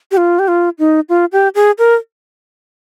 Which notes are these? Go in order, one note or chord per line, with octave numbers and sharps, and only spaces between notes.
G4
F4
G4
F4
D#4
F4
G4
G#4
A#4